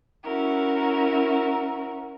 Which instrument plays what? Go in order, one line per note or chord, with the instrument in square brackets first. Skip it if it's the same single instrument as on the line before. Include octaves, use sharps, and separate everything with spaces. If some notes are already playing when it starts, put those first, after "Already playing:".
[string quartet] C#4 E4 F#4 A#4